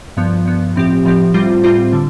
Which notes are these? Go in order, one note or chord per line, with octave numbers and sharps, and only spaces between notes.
G2 F3 B3
G2 F3 B3
A2 F3 C4 G4
A2 F3 C4 G4
A2 G3 C4 F4 C5
A2 G3 C4 F4 C5
D3 G3